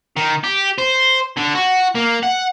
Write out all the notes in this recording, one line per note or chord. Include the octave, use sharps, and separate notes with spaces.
D#3
G4
C5
D3
F#4
A#3
F#5